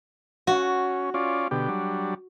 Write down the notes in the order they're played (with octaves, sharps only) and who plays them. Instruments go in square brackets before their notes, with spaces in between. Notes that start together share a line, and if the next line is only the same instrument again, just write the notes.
[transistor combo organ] C#4 [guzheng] F#4
[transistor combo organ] C#4 F4 D5
B2 D3 G4
F#3 G3 D4